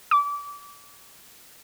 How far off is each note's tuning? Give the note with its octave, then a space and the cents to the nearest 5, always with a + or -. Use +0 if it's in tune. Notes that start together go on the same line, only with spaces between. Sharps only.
D6 -30